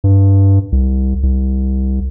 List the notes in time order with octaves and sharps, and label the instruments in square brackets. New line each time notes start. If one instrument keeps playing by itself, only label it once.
[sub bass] G2
C2
C2